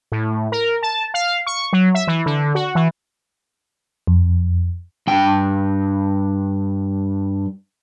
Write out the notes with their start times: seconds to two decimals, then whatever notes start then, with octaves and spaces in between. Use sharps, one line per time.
0.12 A2
0.52 A#4
0.83 A5
1.14 F5
1.46 C#6
1.73 F#3
1.94 E5
2.07 E3
2.26 D3
2.55 F#4
2.75 E3
4.07 F2
5.07 G2 G5